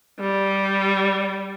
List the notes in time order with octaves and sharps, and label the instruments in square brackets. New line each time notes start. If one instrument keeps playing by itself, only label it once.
[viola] G3